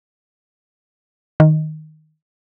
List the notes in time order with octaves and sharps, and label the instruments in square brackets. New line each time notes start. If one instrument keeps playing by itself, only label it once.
[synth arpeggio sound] D#3